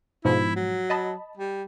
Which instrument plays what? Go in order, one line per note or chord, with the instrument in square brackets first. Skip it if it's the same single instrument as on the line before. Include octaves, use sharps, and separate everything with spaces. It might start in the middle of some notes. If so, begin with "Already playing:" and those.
[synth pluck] G#2 B2 F3 [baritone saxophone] E4
[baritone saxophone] F#3
[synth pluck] D#5 A5 B5
[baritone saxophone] G3